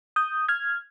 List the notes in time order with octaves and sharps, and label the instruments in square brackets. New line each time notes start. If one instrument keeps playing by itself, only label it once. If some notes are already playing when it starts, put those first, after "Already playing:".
[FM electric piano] D#6 G6
F6 G#6